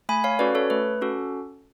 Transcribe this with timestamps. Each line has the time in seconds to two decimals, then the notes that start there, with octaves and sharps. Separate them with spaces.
0.09 A3 G#5 B5
0.24 C#5 F5
0.39 C#4 F#4 A4 B4 D5
0.55 A4 C#5
0.70 A3 B4
1.01 C#4 F#4 A4